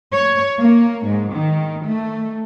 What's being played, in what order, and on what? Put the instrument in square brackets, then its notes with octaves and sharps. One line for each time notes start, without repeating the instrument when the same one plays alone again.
[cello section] C#5
A#3
G#2
D#3
A3